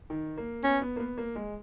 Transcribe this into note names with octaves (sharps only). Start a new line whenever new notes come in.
D#3
A#3
B3 C#4
B3
A#3
B3
A#3
G#3